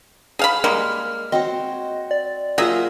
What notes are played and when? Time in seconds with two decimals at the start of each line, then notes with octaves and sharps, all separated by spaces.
0.39 G#4 F5 B5
0.64 G3 G#3 A#3 F6
1.32 C4 F#4 C#5 D#5
2.11 D5
2.58 F#3 A#3 F4 G#4 E5 A#5